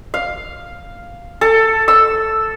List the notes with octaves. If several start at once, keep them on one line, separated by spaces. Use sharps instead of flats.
F5
A4
E6